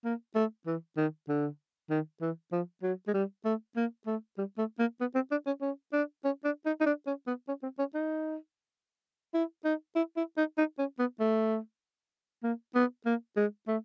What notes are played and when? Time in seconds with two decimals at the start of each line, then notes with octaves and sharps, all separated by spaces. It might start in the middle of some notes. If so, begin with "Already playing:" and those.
0.05 A#3
0.35 A3
0.66 E3
0.97 D#3
1.28 D3
1.90 D#3
2.21 E3
2.52 F3
2.83 F#3
3.08 G#3
3.14 G3
3.45 A3
3.76 A#3
4.07 A3
4.38 G3
4.58 A3
4.79 A#3
5.01 B3
5.15 C4
5.31 D4
5.46 C#4
5.61 C#4
5.93 D4
6.24 C#4
6.44 D4
6.66 D#4
6.81 D#4
6.86 D4
7.07 C#4
7.27 B3
7.48 C#4
7.63 C4
7.79 C#4
7.94 D#4
9.34 E4
9.65 D#4
9.96 E4
10.17 E4
10.37 D#4
10.58 D#4
10.79 C#4
10.99 B3
11.20 A3
12.43 A#3
12.75 B3
13.06 A#3
13.36 G#3
13.68 A3